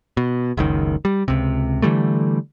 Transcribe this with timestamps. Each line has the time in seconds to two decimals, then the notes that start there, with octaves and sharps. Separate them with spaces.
0.17 B2
0.57 F#1 C#2 D#3
1.05 G3
1.28 C#2 C3
1.82 D3 E3 G3 A3